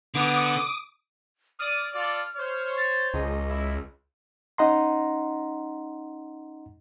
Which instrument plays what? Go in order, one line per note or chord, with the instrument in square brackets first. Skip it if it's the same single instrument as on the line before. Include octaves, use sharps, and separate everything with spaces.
[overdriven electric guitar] D3 [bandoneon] B3 [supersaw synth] D6 D#6 D7
[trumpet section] D5 D#6 [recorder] F6
[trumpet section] F4 A4 D5
C5 C#5
[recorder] A6
[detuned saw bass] C#2 [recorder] D#5
[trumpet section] E4
[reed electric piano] C#4 D#4 D#5 F#5 A#5 C6